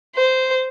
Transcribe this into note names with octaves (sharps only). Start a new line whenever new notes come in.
C5